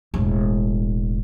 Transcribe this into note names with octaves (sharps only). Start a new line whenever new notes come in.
E1 A2